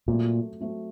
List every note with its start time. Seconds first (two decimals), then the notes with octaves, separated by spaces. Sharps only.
0.08 A#2 F#3 A3 C4
0.60 F#3 A3 C4